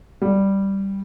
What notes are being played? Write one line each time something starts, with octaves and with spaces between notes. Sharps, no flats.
G3